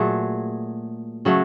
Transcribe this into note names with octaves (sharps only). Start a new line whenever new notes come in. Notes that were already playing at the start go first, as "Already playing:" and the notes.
Already playing: A#2 F#3 A3 G#4
C#3 F#3 A3